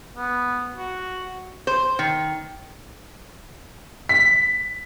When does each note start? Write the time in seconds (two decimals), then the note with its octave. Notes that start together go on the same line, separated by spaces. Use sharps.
0.16 B3
0.77 F#4
1.67 C5
1.99 D#3
4.09 B6